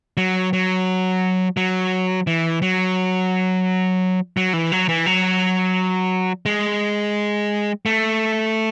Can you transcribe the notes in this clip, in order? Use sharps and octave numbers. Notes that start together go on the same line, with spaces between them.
F#3
F#3
F#3
E3
F#3
F#3
E3
F#3
E3
F#3
G#3
A3